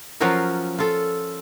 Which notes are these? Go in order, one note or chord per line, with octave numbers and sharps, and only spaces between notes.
F3 F#3 C#4 F4 F#4 A#4
F4 A4